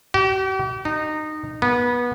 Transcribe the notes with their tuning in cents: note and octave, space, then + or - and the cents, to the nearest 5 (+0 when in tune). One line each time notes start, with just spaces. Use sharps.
G4 -45
D#4 -20
B3 -25